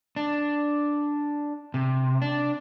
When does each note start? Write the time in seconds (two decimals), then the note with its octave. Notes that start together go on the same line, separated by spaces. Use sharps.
0.16 D4
1.74 C3
2.22 D4